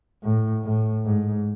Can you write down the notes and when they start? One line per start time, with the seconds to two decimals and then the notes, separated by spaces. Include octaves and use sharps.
0.23 A2
0.64 A2
1.05 G#2